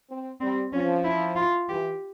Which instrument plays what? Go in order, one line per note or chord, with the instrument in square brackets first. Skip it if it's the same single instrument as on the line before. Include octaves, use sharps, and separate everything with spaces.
[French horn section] C4
[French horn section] G3 [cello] C4
[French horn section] F3 [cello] C#4
[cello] E4
F4
[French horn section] E3 [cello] G4